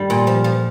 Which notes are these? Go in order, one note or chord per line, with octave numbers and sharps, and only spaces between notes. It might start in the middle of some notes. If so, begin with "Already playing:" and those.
Already playing: G2 D#3 G3
A#2
F3
F3